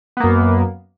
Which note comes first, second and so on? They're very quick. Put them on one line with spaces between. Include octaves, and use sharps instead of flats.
B3 A#3 F#2